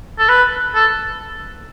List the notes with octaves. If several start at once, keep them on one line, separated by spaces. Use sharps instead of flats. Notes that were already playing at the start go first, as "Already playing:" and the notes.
A4
B4
A4